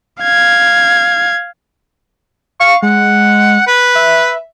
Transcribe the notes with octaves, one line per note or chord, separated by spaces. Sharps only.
F5 G#6
F5 C#6
G#3 F#5
B4
E5